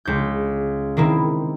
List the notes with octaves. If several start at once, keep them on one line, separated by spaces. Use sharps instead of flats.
C#2 G6
D#3 A#3 C4 E4